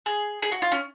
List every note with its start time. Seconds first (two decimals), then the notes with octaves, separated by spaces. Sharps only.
0.06 G#4
0.42 G#4
0.52 F#4
0.62 F4
0.72 C#4